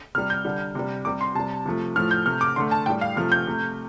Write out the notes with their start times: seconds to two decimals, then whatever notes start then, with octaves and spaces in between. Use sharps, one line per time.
0.15 C3 F6
0.18 G3
0.30 G6
0.45 D3 G3
0.75 C3 G3
1.05 C3 G3 D6
1.21 C6
1.35 C3 G3 A5
1.66 C3 F3 A3
1.95 A2 F3 A3 F6
2.11 G6
2.26 C3 A3 F6
2.41 D6
2.56 D3 A3 C6
2.71 A5
2.86 A2 G3 G5
3.01 F5
3.16 C3 F3 A3 F6
3.32 G6
3.47 C3 A3